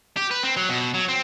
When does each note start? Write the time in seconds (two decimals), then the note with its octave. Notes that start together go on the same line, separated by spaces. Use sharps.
0.17 G4
0.31 B4
0.43 C4
0.57 F#3
0.69 B2
0.94 F#3
1.09 C4